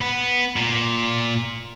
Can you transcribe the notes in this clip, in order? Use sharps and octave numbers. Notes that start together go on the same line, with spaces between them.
B3
A#2